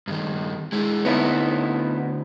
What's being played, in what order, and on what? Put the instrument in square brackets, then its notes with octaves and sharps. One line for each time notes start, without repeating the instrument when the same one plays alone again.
[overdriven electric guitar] G2 D#3
G#3 E4
[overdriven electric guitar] D2 C#5 [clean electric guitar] B3 D#4 E4